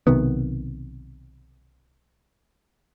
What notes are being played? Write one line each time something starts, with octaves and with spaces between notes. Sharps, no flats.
B1 C3 D#3 B3